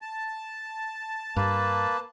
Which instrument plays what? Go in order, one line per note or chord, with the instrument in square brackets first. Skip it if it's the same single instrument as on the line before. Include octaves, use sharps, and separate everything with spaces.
[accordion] A5
[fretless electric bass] G2 [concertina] A#3 B4